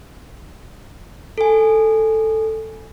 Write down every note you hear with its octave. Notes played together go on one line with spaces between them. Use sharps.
A4 G#5